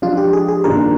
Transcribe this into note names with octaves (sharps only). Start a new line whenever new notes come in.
F3 G#3 D4 F4
G4
G#4
G#4
G2 D#3 A#3 D4 F4 A#4